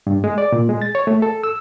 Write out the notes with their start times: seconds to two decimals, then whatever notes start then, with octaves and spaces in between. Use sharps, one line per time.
0.07 G2
0.24 G#3
0.38 D5
0.52 A#2
0.69 G#3
0.82 A6
0.95 C#5
1.07 A3
1.22 A4
1.43 E6